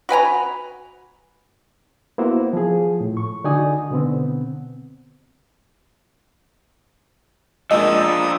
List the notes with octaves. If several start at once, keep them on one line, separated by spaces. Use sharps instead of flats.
F#4 B4 G#5 A#5
A#3 B3 E4 F#4 A#4 C5
F3 G#4
A2
C#6
D3 D#4 F#4 D5 G#5 D#6
B2 D3 B3 C4
F3 G#3 A#3 D4 D#5 D#6 E6